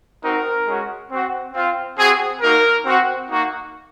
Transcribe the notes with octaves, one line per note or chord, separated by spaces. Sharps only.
C4 D#4 F#4 A#4
G#3 C#4 F#4
C4 F#4
C4 F4
C4 F#4 G#4
A#3 D#4 F#4 A#4
C4 F#4
A#3 D#4 F#4